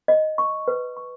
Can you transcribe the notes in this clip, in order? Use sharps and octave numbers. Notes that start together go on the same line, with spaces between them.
D#5
C#6
B4
C#6